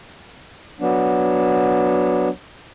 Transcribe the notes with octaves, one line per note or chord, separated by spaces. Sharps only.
F#3 B3 D4